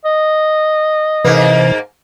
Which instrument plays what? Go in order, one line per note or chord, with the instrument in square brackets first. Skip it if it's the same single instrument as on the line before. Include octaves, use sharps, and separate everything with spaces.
[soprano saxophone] D#5
[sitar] G#2 A#3 [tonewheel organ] C3 E3